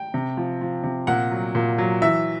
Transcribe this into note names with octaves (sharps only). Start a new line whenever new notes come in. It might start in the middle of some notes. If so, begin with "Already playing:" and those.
Already playing: G5
C3
F3
F3
C3
A#2 F#5
F#3
A#2
F#3
E3 E5